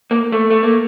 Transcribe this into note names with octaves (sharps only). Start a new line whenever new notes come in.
A#3
A3
A3
A#3